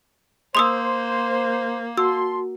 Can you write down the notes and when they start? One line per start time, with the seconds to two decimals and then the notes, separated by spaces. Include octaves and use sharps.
0.55 A#3 C5 C6 D#6 E6
1.97 F#4 A5 C6 E6